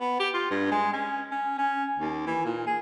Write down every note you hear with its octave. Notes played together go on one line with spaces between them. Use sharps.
B3
G4
F4
G2
G#3
C#4
C#4
C#4
D#2
E3
A#2
G#4